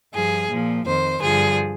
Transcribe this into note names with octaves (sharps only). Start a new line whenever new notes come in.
G2 F3 G#4
A#2 F3
F2 D#3 C5
G2 D3 F3 G#4